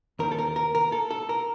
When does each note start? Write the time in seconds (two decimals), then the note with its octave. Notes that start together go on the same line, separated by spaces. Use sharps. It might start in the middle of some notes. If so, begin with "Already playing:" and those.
0.19 D#2 D#3 A#4
0.32 A4
0.38 A#4
0.56 A#4
0.75 A#4
0.92 A4
1.11 A4
1.29 A#4